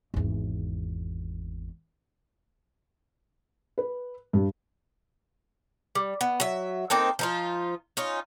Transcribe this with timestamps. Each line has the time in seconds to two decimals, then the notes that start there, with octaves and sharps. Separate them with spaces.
0.14 G#1 E2
3.78 B4
4.33 G2
5.95 G3
6.21 B3
6.40 F#3 E5
6.90 A#3 C4 D#4 A4
7.19 F3 D#4 F4
7.97 C#4 D#4 F4